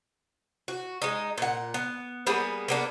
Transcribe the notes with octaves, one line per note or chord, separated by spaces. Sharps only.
F#4
G#3 D#4
A#2 F#5
B3
G3 A#3 B3 G#4
A#3 B3 D4